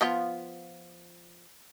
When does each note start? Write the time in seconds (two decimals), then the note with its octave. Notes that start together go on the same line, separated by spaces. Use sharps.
0.01 F3 B3 F4